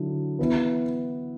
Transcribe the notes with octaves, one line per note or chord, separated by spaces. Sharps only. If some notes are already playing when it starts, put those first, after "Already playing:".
Already playing: D3 F#3 E4
E3 B3 E4 B4